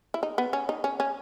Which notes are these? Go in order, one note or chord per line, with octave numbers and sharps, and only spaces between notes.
E4
D#4
B3
C#4
D#4
C#4
C#4